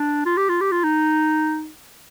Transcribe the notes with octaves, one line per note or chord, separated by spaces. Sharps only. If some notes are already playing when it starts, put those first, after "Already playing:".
Already playing: D4
F4
G4
F4
G4
F4
D#4